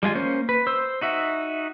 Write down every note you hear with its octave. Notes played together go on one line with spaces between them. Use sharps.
G3 G#3 F4 G#5
A#3 C#4 C5
B4
C5 E6
D#4 F#4 E5